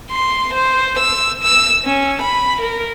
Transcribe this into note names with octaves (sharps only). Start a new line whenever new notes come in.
C6
C5
E6
E6
C#4
B5
A#4